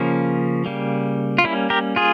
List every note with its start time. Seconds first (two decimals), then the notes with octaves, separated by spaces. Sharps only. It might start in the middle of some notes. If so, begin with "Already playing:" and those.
Already playing: C#3 F3 A#3 C#4
0.66 C#3 G3 A#3
1.38 F4
1.44 G3 A#3 C#4 E4
1.70 G4 A#4
1.96 F4 G#4